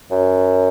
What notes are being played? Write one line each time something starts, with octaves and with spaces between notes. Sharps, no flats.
F#2